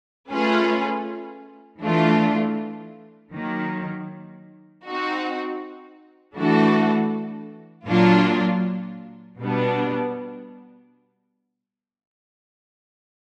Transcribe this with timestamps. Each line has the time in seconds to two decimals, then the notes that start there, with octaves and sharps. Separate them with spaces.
0.31 A3 C#4 F4 G#4 B4
1.82 E3 A3 D4 F4
3.34 D#3 F#3 A#3
4.85 C4 D#4 F#4
6.36 E3 A3 D4 F#4 A4
7.87 A#2 F#3 A#3 D4 F4
9.39 B2 G3 B3 D4